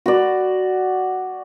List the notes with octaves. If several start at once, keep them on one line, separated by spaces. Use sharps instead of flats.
F#4 D5